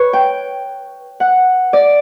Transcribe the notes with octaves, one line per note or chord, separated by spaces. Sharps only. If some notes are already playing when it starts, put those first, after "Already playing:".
Already playing: B4 C#5
G5
F#5
D5